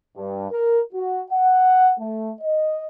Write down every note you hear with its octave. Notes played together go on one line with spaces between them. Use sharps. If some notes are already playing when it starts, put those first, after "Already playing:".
G2
A#4
F#4
F#5
A3
D#5